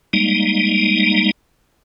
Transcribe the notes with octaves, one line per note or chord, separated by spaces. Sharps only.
G3 G#3 A#3 D#4